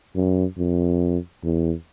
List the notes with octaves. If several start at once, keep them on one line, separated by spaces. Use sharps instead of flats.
F#2
F2
E2